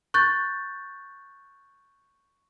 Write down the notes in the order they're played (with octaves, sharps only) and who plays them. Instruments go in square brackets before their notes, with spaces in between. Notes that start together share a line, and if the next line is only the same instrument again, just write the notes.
[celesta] C#6 F#6 G6 A6